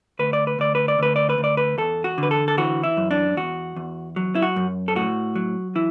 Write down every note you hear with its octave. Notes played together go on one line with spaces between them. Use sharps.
D2 B4
D5
B4
D2 D5
B4
D5
D2 B4
D5
B4
D2
D5
B4
E2 A4
F#4
D3
B4
A4
A4
E3 F#4
E4
F#2
D4
E2 F#4
E2
F#3
E4
F#4
F#2
A4
A2 F#4
F#3
E3 E4